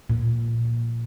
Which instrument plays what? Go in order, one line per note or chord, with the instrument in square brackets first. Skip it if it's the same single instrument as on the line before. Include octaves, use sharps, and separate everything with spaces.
[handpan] A#2